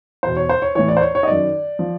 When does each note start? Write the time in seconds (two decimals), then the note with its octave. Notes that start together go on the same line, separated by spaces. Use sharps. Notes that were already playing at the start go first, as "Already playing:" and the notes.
0.23 E2 B2 C5
0.37 C#5
0.49 C5
0.62 C#5
0.75 A2 E3 C#5
0.88 D5
0.97 C5
1.01 C#5
1.15 C#5
1.23 D#5
1.27 F#2 D#3 D5
1.79 F3